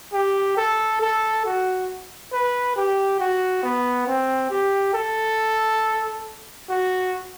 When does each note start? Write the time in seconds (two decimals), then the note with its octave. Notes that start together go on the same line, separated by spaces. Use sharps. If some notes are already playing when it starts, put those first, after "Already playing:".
0.13 G4
0.57 A4
1.01 A4
1.45 F#4
2.32 B4
2.76 G4
3.20 F#4
3.63 B3
4.07 C4
4.50 G4
4.94 A4
6.70 F#4